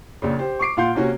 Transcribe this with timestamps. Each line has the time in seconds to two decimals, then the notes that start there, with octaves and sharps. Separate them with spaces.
0.22 A#1 A#2 C#3
0.39 G4 C5
0.59 C#6 D6 C7 D7
0.77 A#2 F4 F5 F#5 C6 G6
0.95 C3 A#3 C#4 F#4